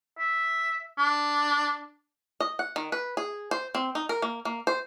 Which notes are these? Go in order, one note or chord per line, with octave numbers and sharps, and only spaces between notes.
E5
D4
D#5
F#5
D#3
B4
G#4
C5
C4
D#4
A#4
A#3
A#3
C5